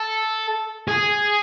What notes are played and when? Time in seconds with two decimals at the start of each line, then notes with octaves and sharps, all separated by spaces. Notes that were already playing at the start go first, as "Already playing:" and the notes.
Already playing: A4
0.88 G#4